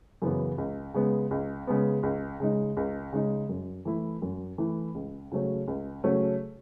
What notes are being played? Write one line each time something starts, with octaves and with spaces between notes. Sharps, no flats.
F#2 C#3 E3 B3
C#2
C#3 G#3 B3
C#2
C#3 G#3 B3
C#2
C#3 G#3 D#4
C#2
C#3 G#3 D#4
F#2
E3 A3 E4
F#2
E3 A3 E4
C#2
C#3 F#3 A3 C#4
C#2
C#3 F#3 A3 C#4